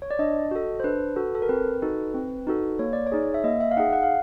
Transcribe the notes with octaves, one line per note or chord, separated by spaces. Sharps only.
C#5
D5
D4 D#5
F#4 A4
C5
D4 B4
F#4 A4
A4
A#4
C4 B4
D#4 F#4 A4
C4
D#4 F#4 A4
A#3 C#5
D5
C#5
D#4 G#4
E5
A#3 D#5
E5
F5
D#4 G#4 F#5
F#5
F5